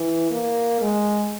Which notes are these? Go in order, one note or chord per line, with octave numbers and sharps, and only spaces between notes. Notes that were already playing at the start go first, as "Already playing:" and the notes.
Already playing: E3
A#3
G#3